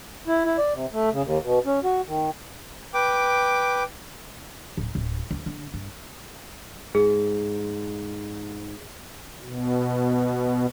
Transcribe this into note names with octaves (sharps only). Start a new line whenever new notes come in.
E4
E4
D5
C3
A3
C#3
D#2
B2
C#4
F#4
D#3
B4 G5 D6
D1
D1
D2
D3
G2
G#2 G#4
B2